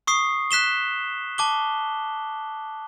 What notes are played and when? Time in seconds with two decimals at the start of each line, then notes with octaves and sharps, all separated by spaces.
0.07 C#6 D#6 C7
0.51 F#6 B6 E7 G7
1.38 A5 D6 G7